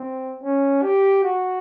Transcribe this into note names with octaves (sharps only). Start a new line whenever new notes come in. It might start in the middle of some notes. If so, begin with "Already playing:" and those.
Already playing: C4
C#4
G4
F#4